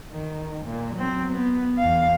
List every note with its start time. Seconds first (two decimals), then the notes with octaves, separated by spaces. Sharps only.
0.12 D#3
0.66 A#2
0.95 F#3 C4
1.33 B3
1.79 E2 F5